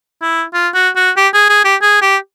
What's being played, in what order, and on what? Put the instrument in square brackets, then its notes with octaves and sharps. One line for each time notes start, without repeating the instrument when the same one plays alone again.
[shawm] E4
F4
F#4
F#4
G4
G#4
G#4
G4
G#4
G4